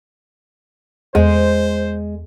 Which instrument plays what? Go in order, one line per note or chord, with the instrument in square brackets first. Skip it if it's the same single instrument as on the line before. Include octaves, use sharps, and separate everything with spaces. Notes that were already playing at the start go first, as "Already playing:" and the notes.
[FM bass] E2 [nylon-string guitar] G#3 [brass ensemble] C5